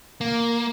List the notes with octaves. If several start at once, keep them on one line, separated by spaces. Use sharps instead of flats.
A#3